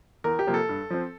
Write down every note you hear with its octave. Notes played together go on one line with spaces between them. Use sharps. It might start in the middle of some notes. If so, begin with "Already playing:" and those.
E2 A#4
G4
C3 F3 A#3
A4
G2
F3 C4